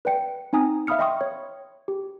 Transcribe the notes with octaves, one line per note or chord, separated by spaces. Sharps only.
B4 D5 G5 C#7
C4 D#4 G#5 A#5 D#6
E5 F5 B5 D#6 F6 C#7
D#5 E5 G5 C6 C#6 D#6
C#5
G4